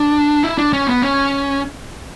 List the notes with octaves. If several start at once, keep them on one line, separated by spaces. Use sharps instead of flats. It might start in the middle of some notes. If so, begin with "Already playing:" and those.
Already playing: D4
E4
D4
C#4
B3
C#4